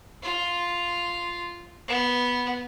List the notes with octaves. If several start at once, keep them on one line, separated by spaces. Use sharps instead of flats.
F4
B3